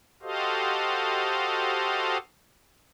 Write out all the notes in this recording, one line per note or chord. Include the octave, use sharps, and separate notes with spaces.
F#4 G4 A4 C5 D#5 F5